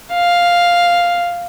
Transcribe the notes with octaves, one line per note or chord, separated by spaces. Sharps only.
F5